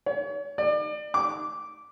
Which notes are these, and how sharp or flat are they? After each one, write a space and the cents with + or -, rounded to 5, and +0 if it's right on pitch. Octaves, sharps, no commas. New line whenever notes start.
C#5 +35
D5 +35
D6 -10